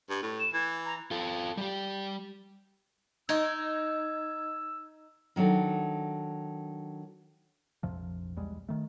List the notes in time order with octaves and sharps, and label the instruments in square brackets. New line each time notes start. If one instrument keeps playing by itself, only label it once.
[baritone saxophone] G2
A2
[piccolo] E7
[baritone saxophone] E3 [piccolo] G#6
[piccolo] A#5
[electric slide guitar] F4 A4
G3 G4
[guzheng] D#4 [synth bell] D#5 G#6 [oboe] E6
[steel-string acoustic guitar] D#3 F#3 D4 A4
[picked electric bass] A#1 F2 C3 F3
B1 E2 G3 G#3
D#3 A3